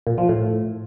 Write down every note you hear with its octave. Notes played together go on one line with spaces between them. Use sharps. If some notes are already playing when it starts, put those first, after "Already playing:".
A#2
F3
A2